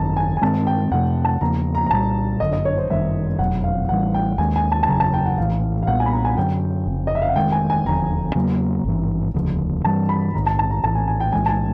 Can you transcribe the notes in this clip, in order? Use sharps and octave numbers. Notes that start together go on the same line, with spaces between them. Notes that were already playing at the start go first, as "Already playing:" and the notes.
Already playing: G#1 F#2 D#3 A5 A#5
G#5
G#5
G2 D#3 G#3 C4 A5
G5
F2 C3 F3 A3 F#5
A5
E2 C#3 F3 A#3 A#5
A#5
A#5
C2 A#2 G3 A5
G1 F#2 D3 D#5
D#5
C#5
C5
G1 F#2 D#3 G3 E5
F1 E2 B2 F#3 F#5
F5
A1 A2 E3 G3 F#5
G5
D#2 D#3 G#3 G#5
G#5
A5
A5
F#1 E2 C#3 F#3 A#5
A5
G5
F#5
A#1 A2 E3 F5
F5
B1 A#2 G3 B3 F#5
G#5
B5
A#5
G#5
F#2 D3 F#3 G5
F1 F2 C#3
D#5
E5
F5
F#5
F1 D#2 D#3 G#3 G5
G#5
G#5
E1 D#2 D3 F3 A#5
E2 C#3 F#3 A#3
G#1 G2 E3
E1 D2 C#3 F3
G2 E3 G3 A5
B5
A#1 G#2 D#3 A#5
A5
A5
A#5
A#1 A2 E3 A5
G#5
G#5
G5
B1 A2 E3 G#3 G#5
A5
G#5